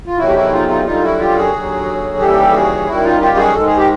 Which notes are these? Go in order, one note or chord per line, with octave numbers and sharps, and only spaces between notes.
F4
E2 C3 D#3 F#3 A3 E4 F#4
G4
E4 F#4
D#4 F4
D#4 F4
F#2 D3 G3 D#4 F4
E4 F#4
F4 G4
F#4 G#4
D#2 D3 F#3
D#2 C#3 E3 G3 G4 A4
F#4 G#4
F#2 D#3 G3 E4 F#4
D#4 F4
F4 G4
F#4 G#4
G#2 D#3 G#3 A4
G#4
G4